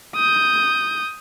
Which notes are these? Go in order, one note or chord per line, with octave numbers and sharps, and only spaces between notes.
D#6 G6